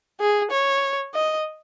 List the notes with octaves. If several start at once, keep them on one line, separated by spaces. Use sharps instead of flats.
G#4
C#5
D#5